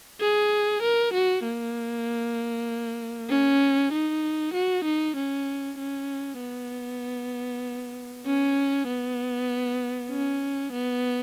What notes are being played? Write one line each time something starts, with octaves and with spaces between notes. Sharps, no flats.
G#4
A#4
F#4
A#3
C#4
D#4
F#4
D#4
C#4
C#4
B3
C#4
B3
C#4
B3